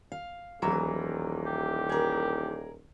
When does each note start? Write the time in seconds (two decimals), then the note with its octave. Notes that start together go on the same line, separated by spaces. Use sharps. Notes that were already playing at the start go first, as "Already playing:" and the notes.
0.12 F5
0.62 D#1 E2 E3 F#3 A#5
1.46 G4
1.89 G#4 A#4